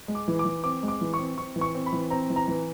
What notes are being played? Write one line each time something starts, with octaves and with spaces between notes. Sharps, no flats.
G#3
D6
E3
D6
E3
C4 D6
G#3
D6
E3
C#6
C4
C4 C#6
E3
C#6
C4
B5
E3
C4 A#5
E3
A#5
E3